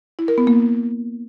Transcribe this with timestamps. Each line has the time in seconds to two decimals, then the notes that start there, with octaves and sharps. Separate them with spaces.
0.19 E4
0.28 A#4
0.38 B3
0.47 A#3